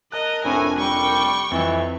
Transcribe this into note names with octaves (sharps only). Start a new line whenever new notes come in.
A#4 D#5 A5 F#6
F1 A2 C4 D4 A#4 G#5
G3 G5 C#6
F2 E3